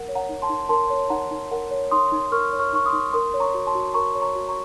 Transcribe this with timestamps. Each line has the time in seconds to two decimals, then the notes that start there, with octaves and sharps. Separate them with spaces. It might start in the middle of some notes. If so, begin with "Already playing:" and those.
Already playing: A#4 F#5
0.08 C#5
0.15 F#5 A#5
0.29 D#4
0.42 A5 C6
0.49 D#4
0.69 A#4 A5 C6
0.90 C#5
1.10 D#4 F#5 A#5
1.31 D#4
1.51 A#4 F#5
1.71 C#5
1.91 D#4 C6 D#6
2.12 D#4
2.32 A#4 C#6 F6
2.53 C#5
2.59 C#6 F6
2.73 D#4 C#6
2.86 C6 D#6
2.93 D#4
3.13 A#4 C6 D#6
3.34 C#5
3.40 A#5 C#6
3.54 F#4
3.67 A5 C6
3.75 F#4
3.94 A#4 A#5 C#6
4.15 C#5
4.22 A#5 C#6
4.35 F#4
4.49 A#5 C#6